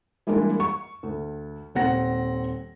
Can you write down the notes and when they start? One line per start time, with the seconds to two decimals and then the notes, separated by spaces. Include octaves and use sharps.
0.27 E3 G3 G#3 A#3 D4 E4
0.60 C#6
1.03 D2
1.75 D#1 C4 F#5 A#6